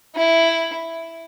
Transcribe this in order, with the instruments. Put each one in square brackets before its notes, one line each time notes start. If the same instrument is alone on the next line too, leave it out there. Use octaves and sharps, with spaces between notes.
[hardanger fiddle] E4